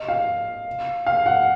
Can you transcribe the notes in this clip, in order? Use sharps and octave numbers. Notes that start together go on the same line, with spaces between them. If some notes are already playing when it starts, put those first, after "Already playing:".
Already playing: D#5
F5
F5
F#5